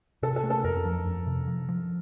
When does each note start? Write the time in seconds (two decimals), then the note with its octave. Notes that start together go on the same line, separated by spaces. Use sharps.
0.23 C3 A4
0.36 A4
0.43 A3
0.50 A4
0.64 F2 A#4
0.85 F3
1.06 F2
1.27 C3
1.47 F3
1.69 F3